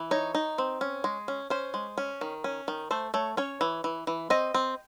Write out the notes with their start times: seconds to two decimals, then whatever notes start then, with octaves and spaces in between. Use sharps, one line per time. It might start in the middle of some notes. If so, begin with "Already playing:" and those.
Already playing: E3
0.11 D#4 C#5
0.35 D#4
0.58 C4
0.81 C#4
1.04 G#3
1.28 C#4
1.50 C#4 C5
1.74 G#3
1.98 C#4
2.21 D#3
2.44 C#4
2.68 D#3
2.91 A3 C5
3.14 A3 C#5
3.37 C#4 C#5
3.61 E3
3.84 E3
4.07 E3
4.30 C4 D#5
4.54 C4